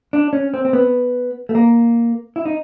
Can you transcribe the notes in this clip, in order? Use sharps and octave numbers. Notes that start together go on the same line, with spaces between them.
D4
C#4
C4
C4
B3
A3
A#3
E4
D#4